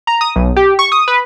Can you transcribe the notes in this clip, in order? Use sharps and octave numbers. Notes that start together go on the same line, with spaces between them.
A#5
D#6
B1
G4
C#6
D#6
B4